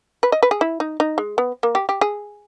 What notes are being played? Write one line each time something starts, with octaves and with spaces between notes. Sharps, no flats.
B4
D#5
B4
G#4
E4
D#4
D#4
G#3
B3
A#3
G4
G4
G#4